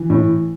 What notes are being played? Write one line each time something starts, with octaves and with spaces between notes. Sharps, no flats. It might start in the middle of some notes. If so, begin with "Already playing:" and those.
Already playing: E3
A2